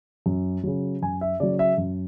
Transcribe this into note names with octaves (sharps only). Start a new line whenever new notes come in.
F#2
C#3 F#3
F#2 G#5
E5
C#3 F#3 D5
E5
F#2